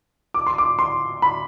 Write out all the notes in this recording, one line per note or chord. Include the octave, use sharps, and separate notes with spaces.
D6
C6
D6
C6
B5